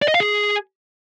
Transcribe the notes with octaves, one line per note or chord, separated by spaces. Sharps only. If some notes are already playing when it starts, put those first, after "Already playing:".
D5
D#5
F5
G#4